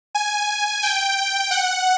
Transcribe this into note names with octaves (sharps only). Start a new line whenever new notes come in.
G#5
G5
F#5